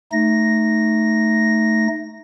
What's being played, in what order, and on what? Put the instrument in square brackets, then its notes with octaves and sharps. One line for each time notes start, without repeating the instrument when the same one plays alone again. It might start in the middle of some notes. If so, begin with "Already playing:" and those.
[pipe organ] A3 D#4 A#6